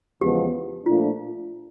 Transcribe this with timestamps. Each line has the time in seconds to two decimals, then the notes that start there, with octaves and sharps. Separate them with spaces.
0.21 E2 C#3 F3 G#3 B3 G4
0.86 A#2 F3 A3 D4 F4